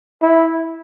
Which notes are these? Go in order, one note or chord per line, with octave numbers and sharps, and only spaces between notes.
E4